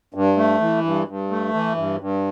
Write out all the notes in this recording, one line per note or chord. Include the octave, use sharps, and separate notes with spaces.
G2
A3
E3
G2
G2
A3
E3
G2
G2